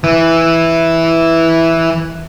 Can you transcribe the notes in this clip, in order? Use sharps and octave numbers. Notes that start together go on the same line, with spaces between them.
E3 E4